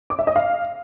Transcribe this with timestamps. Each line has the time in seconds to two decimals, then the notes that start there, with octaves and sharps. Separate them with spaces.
0.10 D6
0.19 E5
0.27 D#5
0.36 F5